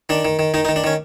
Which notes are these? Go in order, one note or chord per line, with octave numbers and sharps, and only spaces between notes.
D#3 D4
D#3
D#3
D#3 D#4
D#4
D#3
D4
D#3 C#4